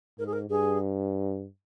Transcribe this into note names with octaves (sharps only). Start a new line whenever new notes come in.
G#2 A#4
G#4
A#4
G2 G#4